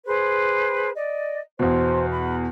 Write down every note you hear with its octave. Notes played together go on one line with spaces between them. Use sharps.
G#4 B4 C5
D5 D#5
E2 B2 C5
F#5 B5